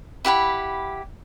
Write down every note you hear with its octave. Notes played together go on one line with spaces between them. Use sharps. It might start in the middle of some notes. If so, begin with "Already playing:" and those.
E4 G4 F#5 B5